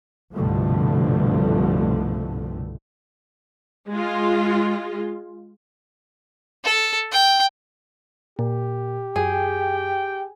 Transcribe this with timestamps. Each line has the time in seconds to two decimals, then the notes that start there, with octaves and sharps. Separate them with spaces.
0.33 C2 G2 B2 D3 F3 A3
3.90 G#3 F4
6.64 A4
7.12 G5
8.39 A#2 G4
9.16 F#2 G#4 G5